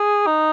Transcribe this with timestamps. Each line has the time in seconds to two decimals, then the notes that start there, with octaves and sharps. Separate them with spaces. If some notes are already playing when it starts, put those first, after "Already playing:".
Already playing: G#4
0.26 D#4